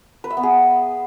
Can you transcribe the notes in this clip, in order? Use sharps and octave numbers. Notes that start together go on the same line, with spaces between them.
B4
E5
B3
G#4